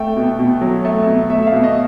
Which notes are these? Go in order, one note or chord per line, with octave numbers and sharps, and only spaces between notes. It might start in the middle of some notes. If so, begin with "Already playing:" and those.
Already playing: A3 G5
B2
B2
F#3
A3
B2
A3 E5
E5
F5
B2
D#5